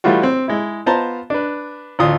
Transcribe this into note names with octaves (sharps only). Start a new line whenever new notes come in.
E3 G3 A3 F4 F#4
C4
G#3 E4
B3 F4 C5 A5 A#5
D4 B4
A1 D2 F4 D#6